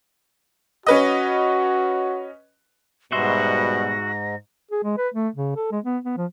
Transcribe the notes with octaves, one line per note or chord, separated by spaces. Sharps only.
C#4 F#4 B4 D#5
G#2 B2 G3 B3 F#4 E5 C6 A#6
G#4
G#3
B4
A3
C#3
A4
G#3
B3
B3
F3